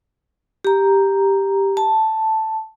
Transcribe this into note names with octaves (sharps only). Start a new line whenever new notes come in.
G4 A#5
A5